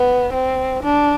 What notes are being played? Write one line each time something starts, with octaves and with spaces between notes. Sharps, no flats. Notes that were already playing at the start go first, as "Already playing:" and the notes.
Already playing: B3
C4
D4